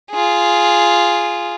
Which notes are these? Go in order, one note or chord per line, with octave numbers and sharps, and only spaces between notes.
F4 G#4